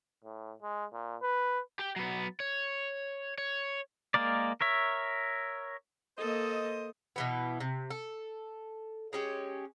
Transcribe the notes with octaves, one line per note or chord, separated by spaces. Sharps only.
A2
G#3
A#2
B4
G4 G5
F#3 B3
C#5
C#5
G#3 A#3 A#4 D5
A#4 C#5 E5
A#3 A4 C5 D#5
B2 E3 B3
C3
A4
G#3 C#4 G4